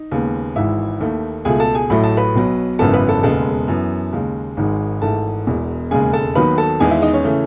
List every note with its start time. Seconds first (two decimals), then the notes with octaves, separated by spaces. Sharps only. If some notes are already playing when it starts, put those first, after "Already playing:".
Already playing: D#4
0.12 D#2 C#3 G#3 B3
0.56 G#1 G#2 E3 E4 E5
1.01 D#2 D#3 A3
1.45 C#2 B2 A3 G#4 G#5
1.60 A4 A5
1.75 G#4 G#5
1.90 A1 A2 F#3 A3 B5
2.04 A5
2.17 B4 B5
2.35 B1 B2 F#3
2.79 G#1 F#2 C#3 E3 B3 A4 A5
2.94 B4 B5
3.09 A4 A5
3.23 E1 D#2 C#3 G#3 B3 A4 A5
3.68 F#2 E3 B3
4.13 D#2 C#3 G#3
4.57 G#1 G#2 D#3 G#3
5.02 G#1 G#2 E3 A3 A4 A5
5.47 E1 E2 B2
5.91 E1 D#2 C#3 G#3 G#4 G#5
6.13 A4 A5
6.35 D#2 D#3 F#3 B3 B4 B5
6.58 A4 A5
6.80 E2 D#3 G#3 B3 G#4 G#5
6.91 E4 E5
7.02 D#4 D#5
7.13 C#4 C#5
7.24 C#3 E3 A3